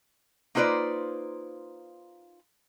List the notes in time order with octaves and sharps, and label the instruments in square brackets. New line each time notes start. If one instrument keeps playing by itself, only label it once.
[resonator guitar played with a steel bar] A#3 D#4 F4 B4 C5 D5